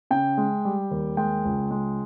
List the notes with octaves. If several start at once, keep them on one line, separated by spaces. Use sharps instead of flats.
C#3 G5
G#3
G3
D#2
G#3 G5
C#2
G#3